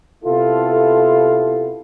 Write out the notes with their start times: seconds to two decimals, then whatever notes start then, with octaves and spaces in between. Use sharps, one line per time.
0.24 C3 B3 E4 F4 A4